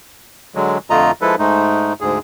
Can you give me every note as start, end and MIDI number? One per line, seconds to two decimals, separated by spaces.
0.55 0.78 50
0.55 0.78 54
0.55 0.78 56
0.90 1.11 41
0.90 1.11 50
0.90 1.11 57
0.90 1.11 65
0.90 1.11 75
0.90 1.11 82
1.21 1.35 53
1.21 1.35 56
1.21 1.35 64
1.21 1.35 69
1.21 1.35 71
1.39 1.93 44
1.39 1.93 56
1.39 1.93 57
1.39 1.93 63
2.01 2.19 38
2.01 2.19 44
2.01 2.19 68